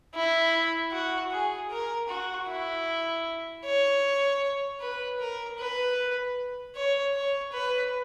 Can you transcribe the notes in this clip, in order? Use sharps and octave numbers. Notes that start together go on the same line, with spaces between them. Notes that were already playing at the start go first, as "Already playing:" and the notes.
E4
F#4
G#4
A#4
F#4
E4
C#5
B4
A#4
B4
C#5
C#5
B4